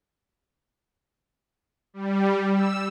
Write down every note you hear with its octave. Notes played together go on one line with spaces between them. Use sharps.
G3
E6